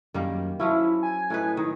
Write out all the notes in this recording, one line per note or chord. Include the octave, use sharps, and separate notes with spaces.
F#2 D#3 G3 A#3
F3 F#3 C#4 E4
G#5
A2 D#4 B4
D#3 D#4